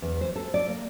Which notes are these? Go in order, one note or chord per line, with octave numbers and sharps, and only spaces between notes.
E2
C5
A4
D5
A#3